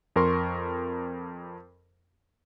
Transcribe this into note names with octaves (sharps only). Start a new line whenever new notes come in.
F2 A#4 C6 C#6